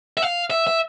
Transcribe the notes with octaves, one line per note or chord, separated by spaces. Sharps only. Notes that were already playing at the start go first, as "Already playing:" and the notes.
E5
F5
E5
E5